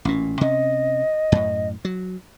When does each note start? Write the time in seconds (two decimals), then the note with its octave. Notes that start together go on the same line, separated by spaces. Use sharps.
0.05 A1 A#2 C#4
0.41 C3 C#4 D#5
1.32 F#2 A2
1.85 F#3